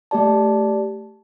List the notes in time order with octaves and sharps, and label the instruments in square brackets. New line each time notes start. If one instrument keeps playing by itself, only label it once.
[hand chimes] A3 G4 D5 A5